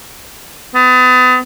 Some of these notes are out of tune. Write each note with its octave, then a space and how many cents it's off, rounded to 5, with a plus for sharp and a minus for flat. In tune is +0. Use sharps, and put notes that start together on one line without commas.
B3 +35